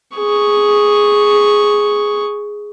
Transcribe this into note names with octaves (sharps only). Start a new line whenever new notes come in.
G#4 C#6